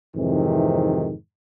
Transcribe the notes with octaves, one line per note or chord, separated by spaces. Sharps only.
F2 G#2 C3 D#3 E3